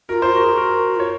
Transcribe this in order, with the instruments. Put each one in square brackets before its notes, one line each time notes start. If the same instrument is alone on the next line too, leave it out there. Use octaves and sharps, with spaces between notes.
[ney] F#4 [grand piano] A#4
[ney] F4
[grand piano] C5
[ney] F#4 [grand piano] A#4
[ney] G#4
[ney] F#4 [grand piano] A#4
[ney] F4 [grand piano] C#5